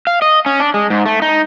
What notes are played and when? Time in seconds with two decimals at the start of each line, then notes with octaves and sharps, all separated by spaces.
0.07 F5
0.22 D#5
0.46 C#4
0.60 D4
0.74 G#3
0.90 G#2
1.06 A3
1.22 D#4